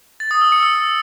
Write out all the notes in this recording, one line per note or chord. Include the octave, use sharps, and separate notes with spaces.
A6
D#6
E6
C#7
E6